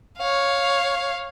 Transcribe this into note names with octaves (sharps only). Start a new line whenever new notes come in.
C#5 F5